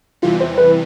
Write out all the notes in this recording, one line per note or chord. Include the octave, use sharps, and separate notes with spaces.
E2 C3 E3 G3 F4
C5
B4